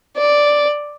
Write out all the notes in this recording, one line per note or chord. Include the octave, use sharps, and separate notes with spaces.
D5